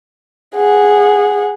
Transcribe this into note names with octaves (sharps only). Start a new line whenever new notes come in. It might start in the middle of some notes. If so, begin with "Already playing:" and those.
G#4 F#5